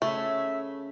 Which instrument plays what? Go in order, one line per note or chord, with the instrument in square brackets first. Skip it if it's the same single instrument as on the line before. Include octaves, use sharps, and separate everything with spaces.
[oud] C#3 C#4 [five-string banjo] A3 [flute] E5